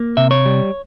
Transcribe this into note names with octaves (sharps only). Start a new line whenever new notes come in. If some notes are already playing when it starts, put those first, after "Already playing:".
Already playing: A#3
C3 E5
C#5
G3